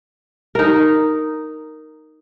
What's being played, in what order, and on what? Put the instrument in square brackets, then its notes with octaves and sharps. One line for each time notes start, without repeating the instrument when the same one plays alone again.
[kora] D#4 A#4